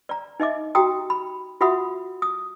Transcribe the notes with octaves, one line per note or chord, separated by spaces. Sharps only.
D5 A#5
D#4 D#5 E5 D6
F#4 G4 G5 A#5 D#6
B5
F4 F#4 E5 F#5 B5 D#6
D#6